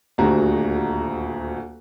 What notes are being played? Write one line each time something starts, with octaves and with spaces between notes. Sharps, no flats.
D#1 D2 F#4 A#5